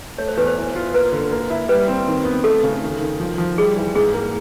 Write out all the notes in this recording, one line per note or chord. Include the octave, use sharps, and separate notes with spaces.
A3 C#5
C5
E2 B4
C5
E3
F4
A#3 B4
D3
A#3
E4
G3 B4
C4
D#3
B3
A3 A4
C#3
D#3
D#3
F3
F3
G3 G#4
E3
G#2 G#4
A#3